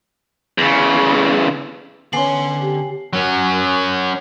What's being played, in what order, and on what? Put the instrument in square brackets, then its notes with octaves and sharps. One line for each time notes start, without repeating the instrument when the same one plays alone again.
[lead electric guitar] E2 C#3
[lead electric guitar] D3 C6 [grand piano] B3 C#4 [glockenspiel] G#5 C7 F#7
[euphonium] G4
[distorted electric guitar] F#3 C#4